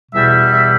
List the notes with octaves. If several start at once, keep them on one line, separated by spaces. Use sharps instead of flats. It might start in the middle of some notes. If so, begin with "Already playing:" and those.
E2 B2 G3 E5
E5